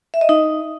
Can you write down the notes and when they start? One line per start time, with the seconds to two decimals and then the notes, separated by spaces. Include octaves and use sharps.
0.14 E5
0.21 D#5
0.29 D#4